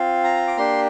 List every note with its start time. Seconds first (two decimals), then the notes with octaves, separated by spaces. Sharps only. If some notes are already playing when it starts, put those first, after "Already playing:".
Already playing: C4 F4
0.24 A#5
0.47 D6
0.57 A#3 D4 G4 C6